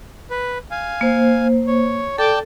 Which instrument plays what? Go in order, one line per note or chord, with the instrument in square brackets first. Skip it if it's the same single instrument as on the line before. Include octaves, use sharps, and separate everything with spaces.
[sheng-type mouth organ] B4
F5 G#5
[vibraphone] A#3 C5
[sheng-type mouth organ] C#5
[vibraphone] A4 [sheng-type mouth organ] D5 G5 A5